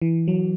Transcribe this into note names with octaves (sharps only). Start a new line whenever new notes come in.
E3
F#3